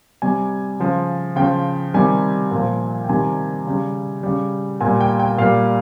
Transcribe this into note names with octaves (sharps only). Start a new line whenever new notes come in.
C3 G3 G#5
C#3 F3
C#3 F3 G5
C3 D#3 G3 G#5
A#2 F3
G5
C3 D#3 G3 G#5
C#3 G3
C#3 G3
A#2 G3 G#5
G5
G5
A#2 G3 F5